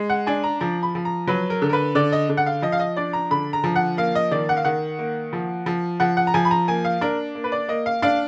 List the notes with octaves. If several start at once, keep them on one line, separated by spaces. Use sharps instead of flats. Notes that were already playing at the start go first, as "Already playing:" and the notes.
Already playing: G#3
F#5
D4 G#5
A#5
F3 A#5
B5
F3
A#5
F#3 B4
A#4
D3
A#4
B4
D3 D5
D#5
D3
F#5
F5
F3 D#5
F5
D#5
D4 D5
A#5
D3 B5
A#5
F3
F#5
A#3 F5
D#5
D#3 D5
F#5
F5
D#3 F#5
A#3
F3
F3
F3 F#5
F#5
A#5
F3 G#5
B5
A#5
A#3 G#5
F5
D4 A#4
A#3
B4
D5
A#3 D#5
F5
D4 F5